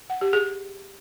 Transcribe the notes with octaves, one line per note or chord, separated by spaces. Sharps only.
F#5
G4
G#4